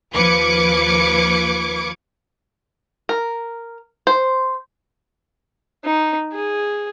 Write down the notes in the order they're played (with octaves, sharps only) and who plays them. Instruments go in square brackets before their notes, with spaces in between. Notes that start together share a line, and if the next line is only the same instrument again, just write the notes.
[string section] D#2 F3 B4 D6 G#6 C#7
[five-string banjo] A#4
C5
[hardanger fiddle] D#4
G#4